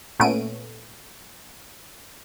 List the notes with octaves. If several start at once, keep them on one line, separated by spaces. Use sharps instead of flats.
A#2 A3 B3 C#4 D7 D#7